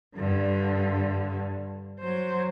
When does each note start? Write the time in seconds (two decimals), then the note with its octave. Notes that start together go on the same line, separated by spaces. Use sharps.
0.16 G2 D3
2.00 F#3 C5